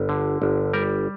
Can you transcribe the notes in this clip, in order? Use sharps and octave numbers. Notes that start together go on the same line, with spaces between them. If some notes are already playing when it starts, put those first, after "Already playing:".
Already playing: G1
D3
G1
G3 A#4